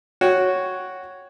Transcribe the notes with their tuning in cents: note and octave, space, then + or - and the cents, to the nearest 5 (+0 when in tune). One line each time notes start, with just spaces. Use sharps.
F#4 +0 C#5 +0 G5 +0